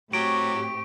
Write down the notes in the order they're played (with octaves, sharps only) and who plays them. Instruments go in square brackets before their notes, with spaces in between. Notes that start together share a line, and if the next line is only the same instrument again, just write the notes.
[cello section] A2 C4 G4 [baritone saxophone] F#3 [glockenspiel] C#6 [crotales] D7